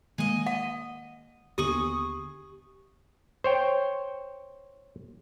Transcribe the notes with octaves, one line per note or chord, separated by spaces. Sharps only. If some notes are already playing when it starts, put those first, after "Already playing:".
D#3 G#3 A#3 G#4 D#5
D#5 F#5
D#2 D3 B3 G4 G#4 C#6 D#6
C5 C#5 G5